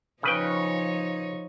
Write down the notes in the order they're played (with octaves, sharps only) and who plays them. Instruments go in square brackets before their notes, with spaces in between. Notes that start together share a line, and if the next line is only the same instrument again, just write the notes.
[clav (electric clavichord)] C#3 B4 G5 [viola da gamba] F3 D#4 C#5